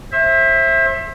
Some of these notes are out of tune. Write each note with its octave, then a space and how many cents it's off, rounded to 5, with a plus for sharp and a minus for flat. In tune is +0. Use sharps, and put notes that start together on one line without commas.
C5 +35 E5 +0